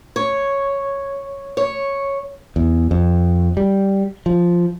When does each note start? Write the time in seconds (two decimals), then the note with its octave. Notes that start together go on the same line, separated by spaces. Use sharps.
0.16 C#5
1.57 C#5
2.56 E2
2.91 F2
3.57 G3
4.26 F3